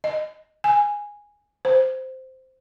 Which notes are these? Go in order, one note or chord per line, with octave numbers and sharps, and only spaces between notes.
D#5
G#5
C5